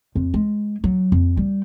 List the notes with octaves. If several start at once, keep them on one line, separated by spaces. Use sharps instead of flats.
F2
G#3
F#3
F2
G3